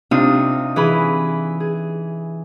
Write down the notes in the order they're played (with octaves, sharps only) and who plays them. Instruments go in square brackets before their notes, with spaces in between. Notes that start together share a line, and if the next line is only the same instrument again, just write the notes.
[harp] C3 D4 D#4 F4 D#6
E3 G#4 B5
G#4